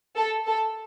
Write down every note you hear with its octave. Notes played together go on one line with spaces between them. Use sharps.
A4
A4